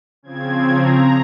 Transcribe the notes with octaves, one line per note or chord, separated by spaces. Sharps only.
C#3 F3 C4 G#6
A#5